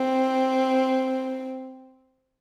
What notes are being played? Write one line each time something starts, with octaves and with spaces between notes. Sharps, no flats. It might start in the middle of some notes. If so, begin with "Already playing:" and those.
Already playing: C4